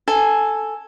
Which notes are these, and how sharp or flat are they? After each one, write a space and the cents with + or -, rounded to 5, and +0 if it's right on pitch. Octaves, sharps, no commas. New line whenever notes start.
A4 +0 G#5 +0